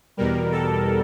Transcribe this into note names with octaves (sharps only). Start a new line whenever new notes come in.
E2 B2 G3 A#4
A4